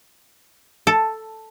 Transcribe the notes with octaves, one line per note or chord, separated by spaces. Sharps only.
A4